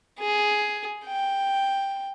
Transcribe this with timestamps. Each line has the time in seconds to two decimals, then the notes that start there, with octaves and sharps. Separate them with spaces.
0.19 G#4
1.07 G5